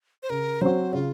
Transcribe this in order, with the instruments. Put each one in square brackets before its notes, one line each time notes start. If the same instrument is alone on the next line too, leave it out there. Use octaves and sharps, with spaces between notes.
[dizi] C5
[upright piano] C#3 [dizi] A#4
[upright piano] F#3 C4 F#4 [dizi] C5
[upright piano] C#3 [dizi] F4